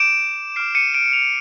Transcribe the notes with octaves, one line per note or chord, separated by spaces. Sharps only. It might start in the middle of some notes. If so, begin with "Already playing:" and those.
Already playing: D6 G6 D7 E7
D6 F6 C7 D7
C#7 D#7
D7 E7
D#7 F7